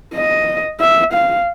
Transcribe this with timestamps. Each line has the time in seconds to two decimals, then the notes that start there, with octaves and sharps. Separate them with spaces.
0.14 D#5
0.81 E5
1.13 F5